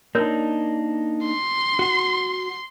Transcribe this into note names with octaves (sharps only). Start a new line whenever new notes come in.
A#3 D4 D#4 A#4 C#5
C6
F#4 F#5